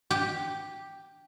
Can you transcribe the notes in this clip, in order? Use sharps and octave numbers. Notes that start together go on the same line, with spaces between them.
G4